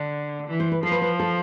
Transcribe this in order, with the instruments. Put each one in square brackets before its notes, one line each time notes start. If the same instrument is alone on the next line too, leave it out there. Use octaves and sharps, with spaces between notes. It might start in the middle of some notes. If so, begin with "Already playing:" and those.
Already playing: [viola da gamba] D3 [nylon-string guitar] D4
[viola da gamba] E3
[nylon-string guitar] C5
B4
[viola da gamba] F3 [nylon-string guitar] A4
[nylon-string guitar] B4
B4
A4